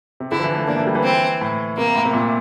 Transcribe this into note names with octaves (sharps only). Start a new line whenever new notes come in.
C3
D3 E4
F3
E3
A3
A#3 D4
A3
G3
E3
C4
A2
C3 A#3
A2
C3
A#2